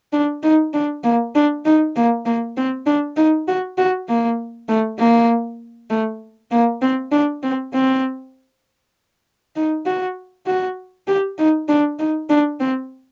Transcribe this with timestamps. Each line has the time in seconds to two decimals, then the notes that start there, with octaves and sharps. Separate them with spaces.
0.13 D4
0.43 D#4
0.74 D4
1.04 A#3
1.35 D4
1.65 D#4
1.96 A#3
2.26 A#3
2.57 C4
2.86 D4
3.16 D#4
3.48 F#4
3.78 F#4
4.08 A#3
4.69 A3
4.99 A#3
5.90 A3
6.51 A#3
6.82 C4
7.12 D4
7.43 C4
7.74 C4
9.56 D#4
9.86 F#4
10.47 F#4
11.08 G4
11.38 D#4
11.68 D4
11.99 D#4
12.30 D4
12.60 C4